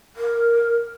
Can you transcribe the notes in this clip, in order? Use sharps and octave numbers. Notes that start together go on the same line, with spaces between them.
A#4